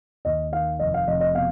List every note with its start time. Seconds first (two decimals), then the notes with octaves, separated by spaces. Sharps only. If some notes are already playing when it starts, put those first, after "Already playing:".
0.25 D#2 D#5
0.52 D#3 F5
0.79 F1 D#5
0.94 F5
1.07 F1 D#5
1.21 D#5
1.35 B2 F5